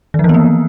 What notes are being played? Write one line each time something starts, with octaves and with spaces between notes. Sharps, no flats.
D#3
F3
E3
B3
A#3